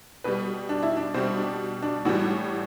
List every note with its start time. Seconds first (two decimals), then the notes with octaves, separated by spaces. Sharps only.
0.24 B2 G3 B4
0.69 D4
0.83 E4
0.97 D4
1.14 B2 G3 C4
1.37 D4
1.82 D4
2.05 A2 E3 G3 F#4